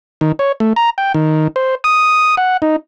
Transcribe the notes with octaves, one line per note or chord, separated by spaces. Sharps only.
D#3
C#5
A3
A#5
G5
D#3
C5
D#6
F#5
D#4